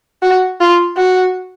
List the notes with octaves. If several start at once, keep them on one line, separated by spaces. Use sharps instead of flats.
F#4
F4
F#4